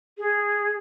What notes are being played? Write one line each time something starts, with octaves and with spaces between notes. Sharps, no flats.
G#4